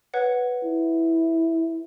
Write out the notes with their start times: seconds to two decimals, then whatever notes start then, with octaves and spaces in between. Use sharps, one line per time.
0.14 B4 C#5 F#5
0.64 E4